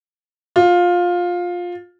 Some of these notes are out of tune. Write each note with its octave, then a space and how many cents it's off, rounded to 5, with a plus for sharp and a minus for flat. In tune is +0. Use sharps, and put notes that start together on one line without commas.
F4 +15